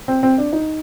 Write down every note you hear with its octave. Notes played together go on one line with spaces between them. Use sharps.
C4
C4
D4
D#4